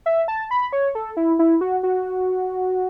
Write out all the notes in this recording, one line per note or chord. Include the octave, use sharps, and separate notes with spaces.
E5
A5
B5
C#5
A4
E4
E4
F#4
F#4